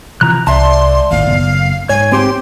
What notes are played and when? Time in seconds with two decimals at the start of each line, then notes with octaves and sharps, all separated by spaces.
0.21 C3 E3 F3 A#5 F#6
0.47 C2 D5 E5 A5 C6
1.11 G#1 D#2 A2 F5
1.27 F#1 B3
1.89 G#2 C#5 G#5
2.12 C4 G4 G5 C6